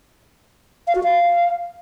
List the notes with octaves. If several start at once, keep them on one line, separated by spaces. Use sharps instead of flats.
F5
F#4
F5